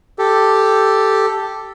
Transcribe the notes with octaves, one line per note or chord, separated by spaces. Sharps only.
G4 A4